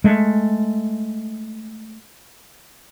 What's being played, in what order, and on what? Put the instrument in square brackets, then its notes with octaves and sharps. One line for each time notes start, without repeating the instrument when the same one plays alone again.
[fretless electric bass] G#3 A3